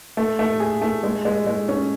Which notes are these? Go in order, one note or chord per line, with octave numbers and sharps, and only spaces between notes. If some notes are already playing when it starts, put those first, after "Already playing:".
A3
A3
G#4
A3
G#3
G#3
G#3
C#4